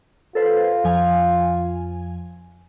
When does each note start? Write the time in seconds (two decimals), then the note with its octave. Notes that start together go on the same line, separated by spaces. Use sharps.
0.35 F4 A4 B4 C5
0.84 F2 F3 G#5